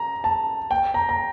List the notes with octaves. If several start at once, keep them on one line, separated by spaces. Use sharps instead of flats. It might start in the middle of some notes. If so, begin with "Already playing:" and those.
Already playing: A#5
A5
G5
A#5
A#5